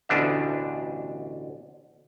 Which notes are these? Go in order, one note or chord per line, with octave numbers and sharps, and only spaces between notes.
A1 D2 B2 D4 E5